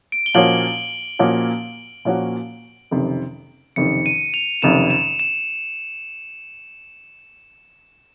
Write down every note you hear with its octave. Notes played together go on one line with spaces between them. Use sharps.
D7
G7
A#2 F3 A#3 C#4 F#4 F#7
A#2 F3 A#3 C#4 F#4
A#2 F3 A#3 C#4 F#4
F#1 F2 C3 D#3
F#1 F2 C3 D#3 C#7
D#7
F7
F#1 F2 C3 D#3 E7
E7
E7